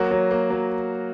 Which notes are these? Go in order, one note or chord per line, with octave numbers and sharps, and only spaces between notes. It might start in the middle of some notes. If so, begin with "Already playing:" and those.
Already playing: F#3 A#3 F#4
F#3
A#3
F#3